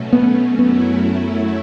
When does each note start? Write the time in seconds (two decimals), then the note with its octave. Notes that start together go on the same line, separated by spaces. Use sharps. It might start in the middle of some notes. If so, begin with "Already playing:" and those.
Already playing: B2 F#3 A3 C#4
0.13 B3
0.59 F#2 F#3 A3 B3 C#4 E4